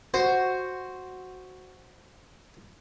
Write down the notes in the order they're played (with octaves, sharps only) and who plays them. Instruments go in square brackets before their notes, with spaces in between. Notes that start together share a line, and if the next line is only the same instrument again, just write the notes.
[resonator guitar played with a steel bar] F#4 [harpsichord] C5